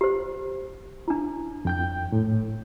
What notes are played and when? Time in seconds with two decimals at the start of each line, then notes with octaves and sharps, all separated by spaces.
0.01 G4 C5
1.08 D4 E4
1.65 F2 G5 G6
2.12 A2